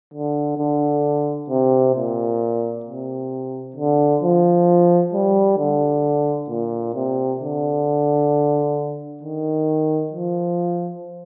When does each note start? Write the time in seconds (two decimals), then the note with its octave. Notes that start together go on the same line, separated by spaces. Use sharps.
0.14 D3
0.58 D3
1.50 C3
1.96 A#2
2.86 C3
3.77 D3
4.23 F3
5.13 G3
5.58 D3
6.49 A#2
6.95 C3
7.41 D3
9.23 D#3
10.13 F3